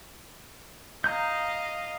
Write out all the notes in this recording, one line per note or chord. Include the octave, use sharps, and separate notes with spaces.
D#5 F5 A#5 D#6 G6